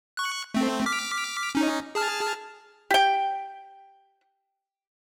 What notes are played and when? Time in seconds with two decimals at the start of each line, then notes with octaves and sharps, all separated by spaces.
0.17 C#6 F#6
0.54 A3 C4
0.86 D6 F6 B6
1.55 C#4 D#4
1.95 G#4 A5 F6
2.91 G4 G5